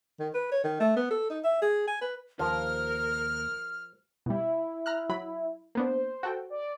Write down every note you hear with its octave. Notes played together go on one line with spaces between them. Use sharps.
D#3
B4
C#5
D#3
A3
B3
A4
D#4
E5
G#4
G#5
B4
D#2 F3 A#4 F6
B2 G3 E4
A#5 F6 F#6
F#3 B5
A#3 B3 D4 C5
F#4 A4 G5
D5